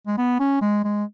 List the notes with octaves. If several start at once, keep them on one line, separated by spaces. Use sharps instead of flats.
G#3
B3
C#4
G#3
G#3